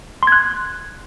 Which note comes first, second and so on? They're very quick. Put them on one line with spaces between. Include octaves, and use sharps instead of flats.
C6 G#6 F#6